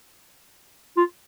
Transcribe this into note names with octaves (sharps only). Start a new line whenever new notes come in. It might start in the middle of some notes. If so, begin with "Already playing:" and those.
F4